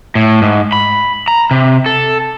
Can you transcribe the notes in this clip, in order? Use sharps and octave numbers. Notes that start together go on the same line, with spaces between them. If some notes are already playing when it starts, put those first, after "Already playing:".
A2
G#2
B5
A#5
C3
A4